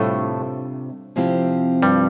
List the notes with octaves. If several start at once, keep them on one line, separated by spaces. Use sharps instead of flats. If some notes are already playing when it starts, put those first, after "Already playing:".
Already playing: A2 C3 G3 A3 D4 F4
C3 F3 C4 E4 G4
G2 G3